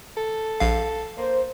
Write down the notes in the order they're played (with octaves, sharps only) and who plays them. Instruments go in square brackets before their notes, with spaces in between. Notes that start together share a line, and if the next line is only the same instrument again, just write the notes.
[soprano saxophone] A4
[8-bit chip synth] A#1 F5
[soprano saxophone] A#3 [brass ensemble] C5